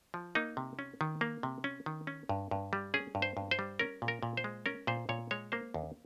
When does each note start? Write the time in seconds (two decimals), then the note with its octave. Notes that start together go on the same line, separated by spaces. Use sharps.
0.14 F3
0.35 A#3 D#4
0.57 C3
0.79 C#4
1.01 D#3
1.21 A#3
1.43 C3
1.64 C#4
1.86 D#3
2.07 C#4
2.29 G2
2.51 G2
2.73 G3
2.94 C#4 G#4
3.15 G2
3.22 C5
3.37 G2
3.51 C5
3.59 G3
3.79 C#4 A#4
4.02 A#2
4.08 A#4
4.23 A#2
4.37 C5
4.44 G#3
4.66 C#4 A#4
4.87 A#2 C5
5.09 A#2 C#5
5.31 G#3 C#5
5.52 A#3 C5
5.74 D#2